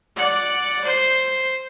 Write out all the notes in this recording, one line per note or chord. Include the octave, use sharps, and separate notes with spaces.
D5 F#5
C5